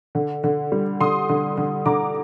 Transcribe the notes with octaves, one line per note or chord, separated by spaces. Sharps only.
D3
D3
G3
D3 C6 D#6
D3
D3
D3 A#5 D6